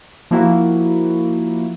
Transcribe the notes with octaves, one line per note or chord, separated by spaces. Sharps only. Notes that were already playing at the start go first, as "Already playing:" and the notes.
F3 A#3 E4 F#4